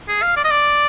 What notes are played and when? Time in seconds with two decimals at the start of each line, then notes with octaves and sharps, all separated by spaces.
0.08 G#4
0.22 F5
0.37 D5
0.45 D#5
0.51 D5